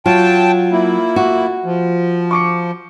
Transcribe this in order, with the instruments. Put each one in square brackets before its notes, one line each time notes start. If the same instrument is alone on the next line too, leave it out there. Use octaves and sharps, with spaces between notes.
[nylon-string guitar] F#3 [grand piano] F4 [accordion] G5 A5
[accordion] A#3 E4
[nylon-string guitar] F#4
[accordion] F3
[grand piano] C#6 D6 C#7